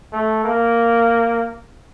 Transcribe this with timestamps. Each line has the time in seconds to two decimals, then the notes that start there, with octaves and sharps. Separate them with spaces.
0.13 A3
0.44 A#3